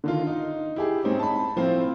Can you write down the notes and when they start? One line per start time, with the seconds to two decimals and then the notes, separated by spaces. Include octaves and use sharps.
0.04 D3 D#3 F4
0.27 D#4
0.76 E4 G4 G#4
1.04 G#2 C4 C#4 D#4
1.19 A5 B5
1.56 A2 F3 C4 E4 F4